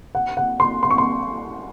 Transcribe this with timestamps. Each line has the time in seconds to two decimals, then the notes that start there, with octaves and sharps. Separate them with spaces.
0.15 F#5
0.37 F#5
0.60 C6
0.83 C6
0.91 C#6
0.98 C6